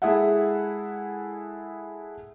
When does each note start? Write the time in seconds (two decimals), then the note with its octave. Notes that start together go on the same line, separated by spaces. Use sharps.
0.02 G#3 E4 G#4 A4 E5 F#5